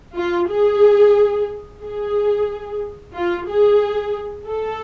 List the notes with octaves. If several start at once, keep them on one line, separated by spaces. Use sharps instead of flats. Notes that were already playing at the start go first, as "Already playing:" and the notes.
F4
G#4
G#4
F4
G#4
A4